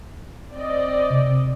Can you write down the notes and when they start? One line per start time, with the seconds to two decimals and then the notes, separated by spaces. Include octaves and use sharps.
0.52 C4 D5 D#5
1.10 C3